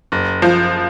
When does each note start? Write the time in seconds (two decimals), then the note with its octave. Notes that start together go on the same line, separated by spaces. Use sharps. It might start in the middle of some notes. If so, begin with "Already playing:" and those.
0.12 F#1
0.42 F3